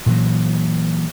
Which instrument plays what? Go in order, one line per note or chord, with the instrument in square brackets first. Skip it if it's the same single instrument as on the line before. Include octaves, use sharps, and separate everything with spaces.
[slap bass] A#2 E3 F#3